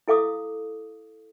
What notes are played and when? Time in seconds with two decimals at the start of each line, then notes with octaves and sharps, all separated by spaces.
0.08 E4 A4 F5 D6 D#6